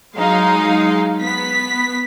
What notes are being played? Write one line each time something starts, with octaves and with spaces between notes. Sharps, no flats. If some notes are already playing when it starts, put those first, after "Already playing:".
F#3 G#3 D#4 F5
B3 B6